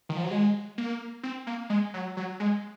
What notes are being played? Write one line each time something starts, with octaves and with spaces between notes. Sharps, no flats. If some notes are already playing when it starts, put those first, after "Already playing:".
D#3
F3
F#3
G#3
A#3
C4
A#3
G#3
F#3
F#3
G#3